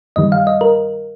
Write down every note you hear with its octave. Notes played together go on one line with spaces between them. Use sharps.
G2 D#3 G3 D#5
F5
D#5
A#4